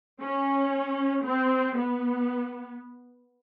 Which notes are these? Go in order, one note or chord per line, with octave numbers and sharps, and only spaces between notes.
C#4
C4
B3